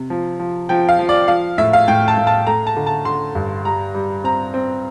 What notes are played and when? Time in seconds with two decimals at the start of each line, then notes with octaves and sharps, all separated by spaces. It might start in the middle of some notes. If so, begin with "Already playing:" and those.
Already playing: C3
0.10 F3
0.39 F3
0.69 F3 G5
0.89 F5
0.99 F3
1.09 D5
1.28 F3 F5
1.58 A2 E5
1.73 F5
1.88 A2 G5
2.08 A5
2.18 A2
2.27 A5
2.47 A3 A#5
2.67 A5
2.77 D3
2.87 A5
3.05 D3 C6
3.35 G2
3.65 G3 A#5
3.95 G3
4.24 C4 A#5
4.54 C4